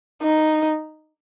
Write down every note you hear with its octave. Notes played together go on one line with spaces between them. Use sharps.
D#4